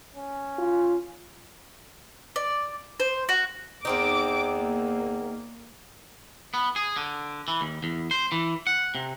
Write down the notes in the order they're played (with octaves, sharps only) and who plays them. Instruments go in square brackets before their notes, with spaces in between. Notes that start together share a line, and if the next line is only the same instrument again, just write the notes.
[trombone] C#4
[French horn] F4
[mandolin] D5
C5
F#4
[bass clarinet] E2 [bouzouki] D#3 C4 D#4 [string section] D6
[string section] A#3
[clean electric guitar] B3
G#4
D3
E3
D#2
E2
C5
E3
F#5
C3